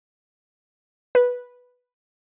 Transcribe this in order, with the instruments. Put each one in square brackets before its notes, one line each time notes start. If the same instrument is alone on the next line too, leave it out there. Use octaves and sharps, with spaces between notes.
[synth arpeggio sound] B4